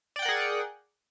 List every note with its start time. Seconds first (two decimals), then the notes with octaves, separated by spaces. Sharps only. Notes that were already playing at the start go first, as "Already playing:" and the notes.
0.16 D5
0.19 G5
0.22 F#5
0.25 A#4
0.29 G#4